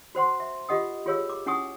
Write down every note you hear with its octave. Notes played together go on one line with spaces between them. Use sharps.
F#4 C5 F#5 C6
E5
F4 G4 D#5 F#5 D#6
F4 G4 G#4 C#5 F5 E6
D6
C#4 E4 F#5 G#5 C#6 D#6